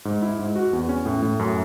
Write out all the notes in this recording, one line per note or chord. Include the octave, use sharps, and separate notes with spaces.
G#2
E4
G#2
F#4
E2
C#4
A2
A2
F#2